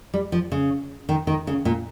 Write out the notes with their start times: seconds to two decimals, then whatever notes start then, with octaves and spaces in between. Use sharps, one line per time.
0.14 G3
0.32 F3
0.52 C#3
1.09 D#3
1.27 D#3
1.47 C#3
1.65 A#2